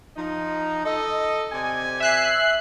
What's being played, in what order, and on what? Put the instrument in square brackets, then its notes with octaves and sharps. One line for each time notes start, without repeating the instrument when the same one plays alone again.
[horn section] F3 D#4
A4 D#5
C3 D5 G#5
[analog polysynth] E5 F#6 C7